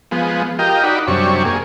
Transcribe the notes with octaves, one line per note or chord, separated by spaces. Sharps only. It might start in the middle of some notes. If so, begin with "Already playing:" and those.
F3 G#3 B3
F4 G4 A#4 D#5 G5
D#4 F#4 D5 B5
F#2 C3 G3 D4 C#6
A#3 G#4